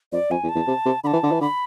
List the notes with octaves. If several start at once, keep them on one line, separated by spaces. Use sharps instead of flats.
F2 D5
F2 G#5
E2
A5
E2
C3
C3
D3 B5
A5
E3
D3
E3
D3 B5